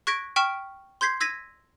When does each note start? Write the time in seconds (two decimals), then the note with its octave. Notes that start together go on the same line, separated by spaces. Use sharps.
0.07 C#6 F#6 G#6 A#6 B6 D7
0.36 G5 C#6 F6 B6 D7 E7
1.01 C6 G6 G#6 B6 C7
1.20 E6 G#6 A#6 B6 D#7